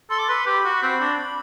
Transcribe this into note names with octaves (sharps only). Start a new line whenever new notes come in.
A4 C6
D6
B4 C6
G4 B5
F#4
C4
D4